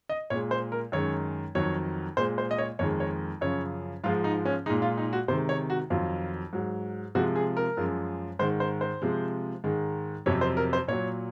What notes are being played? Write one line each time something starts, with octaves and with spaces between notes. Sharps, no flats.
D#5
A#2 G#3 C#5
C5
A#4
F#2 D#3 G#3 C#5
F2 D#3 F#3 C#5
A#2 G#3 C5
C5
D#5
C#5
F2 D#3 G#3 C#5
C#5
F#2 C#3 F3 C#5
G#2 F3 G#3 F4
D#4
C#4
A#2 G#3 D#4
F4
D#4
F#4
C3 D#3 G#3 C5
C#5
F#4
F2 D#3 F#3 F4
G#2 F#3
C3 F3 G#3 F#4
G#4
A#4
F#2 F3 G#3
G#2 D#3 G#3 C5
C5
C5
C3 F3 G#3
G#2 D#3 G#3
F2 C3 F#3 C#5
C5
A#4
C5
A#2 F#3 C#5